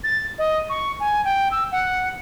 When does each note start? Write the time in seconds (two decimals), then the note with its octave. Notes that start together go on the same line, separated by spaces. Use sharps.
0.04 A6
0.39 D#5
0.69 C#6
1.00 G#5
1.25 G5
1.51 E6
1.72 F#5